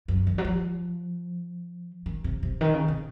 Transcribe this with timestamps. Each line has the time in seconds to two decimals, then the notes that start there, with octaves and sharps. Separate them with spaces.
0.08 F#2
0.27 D#3
0.38 F#3
0.44 F3
2.06 D#3
2.24 C3
2.43 C3
2.61 D#3
2.73 C#3
2.88 C3